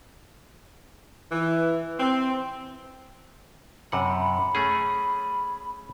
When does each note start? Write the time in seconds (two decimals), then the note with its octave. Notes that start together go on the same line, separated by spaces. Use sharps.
1.32 E3
2.00 C4
3.92 F#2 C3 F#5 B5
4.55 A3 C#4 G#4